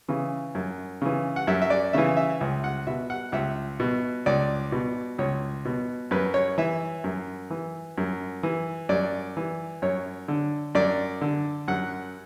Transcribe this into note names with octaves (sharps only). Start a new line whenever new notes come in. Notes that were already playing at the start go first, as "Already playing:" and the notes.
C#3 E3
F#2
C#3 E3
F#5
F#2 E5
E5
D5
C#3 E3 E5
E5
C#2
F#5
B2 E5
F#5
C#2 E5
B2
C#2 D5
B2
C#2 C#5
B2
F#2 B4
C#5
E3 E5
F#2
E3
F#2
E3
F#2 D5
E3
F#2 C#5
D3
F#2 D5
D3
F#2 F#5